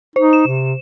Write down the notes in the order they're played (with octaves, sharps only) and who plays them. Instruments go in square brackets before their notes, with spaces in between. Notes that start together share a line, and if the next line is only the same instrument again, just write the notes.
[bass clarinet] D#4 [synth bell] C5
[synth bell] E7
[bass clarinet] C3